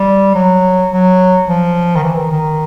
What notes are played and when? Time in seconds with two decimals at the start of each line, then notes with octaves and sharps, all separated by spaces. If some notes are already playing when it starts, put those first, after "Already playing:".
Already playing: G3
0.35 F#3
0.91 F#3
1.48 F3
1.96 D#3
2.04 E3
2.17 D#3
2.32 D#3